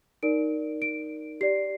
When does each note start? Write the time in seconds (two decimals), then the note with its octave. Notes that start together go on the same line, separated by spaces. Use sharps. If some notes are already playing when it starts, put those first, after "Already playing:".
0.23 D#4 A#4 D5 D7
0.82 D7
1.41 G4 D5 C7